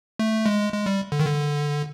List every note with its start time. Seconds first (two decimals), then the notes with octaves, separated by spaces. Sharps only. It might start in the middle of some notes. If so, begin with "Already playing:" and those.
0.19 A3
0.46 G#3
0.73 G#3
0.86 G3
1.12 D3
1.20 D#3
1.26 D3